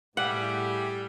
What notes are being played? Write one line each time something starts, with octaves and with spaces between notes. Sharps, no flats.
A2 G3 G4 G#4 E5 F#5